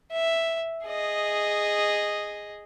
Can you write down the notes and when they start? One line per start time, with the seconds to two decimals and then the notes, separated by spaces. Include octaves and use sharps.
0.11 E5
0.86 G#4 D#5